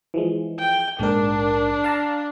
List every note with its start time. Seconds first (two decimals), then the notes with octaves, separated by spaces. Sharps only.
0.14 E3 F3 G#3
0.59 G5
1.00 A#1 G#2 D4 A#4
1.84 F5 A5 A#5